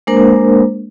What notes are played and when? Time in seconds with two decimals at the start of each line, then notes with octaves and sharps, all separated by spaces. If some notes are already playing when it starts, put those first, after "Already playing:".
0.07 G#3 A#3 D4 A#4 C5